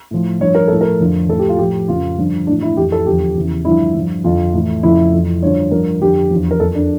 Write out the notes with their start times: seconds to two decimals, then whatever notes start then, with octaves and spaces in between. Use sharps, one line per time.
0.11 A2 F3
0.41 G2 F3 C#5
0.55 A#4
0.68 A2 F3 A4
0.81 A#4
1.00 F2 D3 F3
1.29 A2 F3 A4
1.39 G4
1.48 F4
1.58 A2 F3 G4
1.88 F2 C#3 F3 F4
2.18 G2 D3 F3
2.47 A2 E3 D4
2.62 E4
2.77 F2 E3 G4
2.92 A4
3.06 E2 D3 F3 G4
3.36 E2 C#3 E3
3.65 G2 D3 F3 E4
3.95 G2 F3
4.24 F2 D3 F3 F4
4.53 A2 E3
4.83 F2 C#3 F3 E4
5.13 F2 E3
5.43 G2 D3 F3 C#5
5.71 G2 F3 A#4
6.01 F2 D3 F3 G4
6.31 E2 D3 F3
6.51 A#4
6.60 F2 E3 A4
6.75 D4